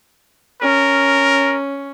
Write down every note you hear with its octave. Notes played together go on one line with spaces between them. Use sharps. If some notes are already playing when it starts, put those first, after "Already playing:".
C#4 A#4